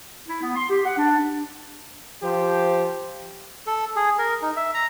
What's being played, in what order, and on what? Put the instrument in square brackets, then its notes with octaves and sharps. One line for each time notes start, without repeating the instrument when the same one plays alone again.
[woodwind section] E4
B3
C6
G4
F#5
D4
[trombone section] F3 G4 C5
[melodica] A4
G#4
A#4
D#4
E5
A#5